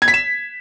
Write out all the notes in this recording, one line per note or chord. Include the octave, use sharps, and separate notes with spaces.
G#6
B6
E7